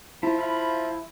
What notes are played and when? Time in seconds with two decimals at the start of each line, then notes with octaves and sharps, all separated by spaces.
0.23 F3 E4
0.39 E4 F5 B5